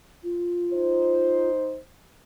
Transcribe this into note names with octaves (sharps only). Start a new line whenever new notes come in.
F4
D#4 C5